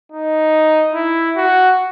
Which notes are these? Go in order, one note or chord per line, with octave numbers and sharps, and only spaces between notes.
D#4
E4
F#4